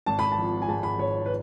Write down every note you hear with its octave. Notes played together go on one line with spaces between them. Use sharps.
G#1 A5
B5
A5
F3
G#5
G#2 A5
B5
G#1 C#5
B4